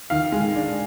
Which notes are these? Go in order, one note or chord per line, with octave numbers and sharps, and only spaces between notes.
D#3 F5
G#3
D4